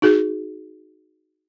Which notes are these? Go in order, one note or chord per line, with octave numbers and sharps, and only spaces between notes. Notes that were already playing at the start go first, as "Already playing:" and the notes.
D#4 F#4 G#4